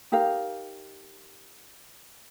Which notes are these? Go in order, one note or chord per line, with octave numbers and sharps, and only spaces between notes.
D#4 G4 A#4 F5